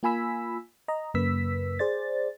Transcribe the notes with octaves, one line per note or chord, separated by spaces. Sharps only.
A#3 F4 G#5 B5 E6 B6
D#5 A#5
F#2 C#3 A#3 B4 E6 B6
G#4 C5 D5 A6